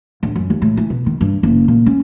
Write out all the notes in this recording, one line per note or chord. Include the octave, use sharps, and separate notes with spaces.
D1
F#2
D#2
A2
E3
B2
D#3
G2
F#1
A#2
C#4